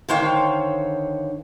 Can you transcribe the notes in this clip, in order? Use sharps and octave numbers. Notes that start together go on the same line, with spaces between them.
D3 D#3 C5 C#5 F5 G5